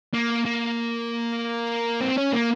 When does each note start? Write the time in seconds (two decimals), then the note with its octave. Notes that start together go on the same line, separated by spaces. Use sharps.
0.14 A#3
0.46 A#3
2.01 C4
2.18 C#4
2.33 A#3